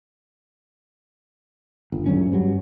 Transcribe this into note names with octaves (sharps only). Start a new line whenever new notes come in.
G1
G1 D2 F#3 C#4
G2 F#3